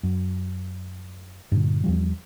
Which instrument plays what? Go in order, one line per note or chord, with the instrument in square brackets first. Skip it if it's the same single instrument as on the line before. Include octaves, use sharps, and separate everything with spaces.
[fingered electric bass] F#2
G2 A#2 D3
E2 F3 G3